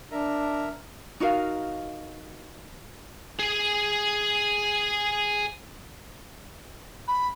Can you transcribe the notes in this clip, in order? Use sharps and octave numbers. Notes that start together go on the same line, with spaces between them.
D4 A#4 E5 A#5
D#4 F#4 A#4 F5
G#4 G#5
B5